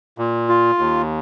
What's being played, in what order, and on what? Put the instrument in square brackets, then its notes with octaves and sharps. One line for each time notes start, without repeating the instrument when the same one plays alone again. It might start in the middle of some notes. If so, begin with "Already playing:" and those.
[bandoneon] A#2
F4
D#2